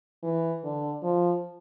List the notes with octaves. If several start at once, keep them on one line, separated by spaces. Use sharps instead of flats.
E3
D3
F3